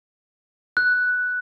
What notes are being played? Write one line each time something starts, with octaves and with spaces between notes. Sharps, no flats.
F#6